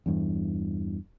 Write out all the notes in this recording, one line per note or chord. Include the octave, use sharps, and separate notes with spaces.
E2 G2 E3